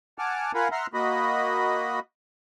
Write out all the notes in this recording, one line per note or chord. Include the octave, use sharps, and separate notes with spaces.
F#5 G#5 A5 D6 F6
F4 A#4 F5 F#5 G#5 B5
E5 F#5 A#5 C6 F6
A#3 F#4 D#5 B5